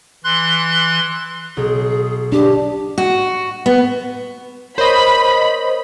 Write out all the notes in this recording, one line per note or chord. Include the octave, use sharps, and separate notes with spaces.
E3 C6 F#6
B1 G#4
D4 G4
F#4
B3
A#4 C5 C#5 D#5 B5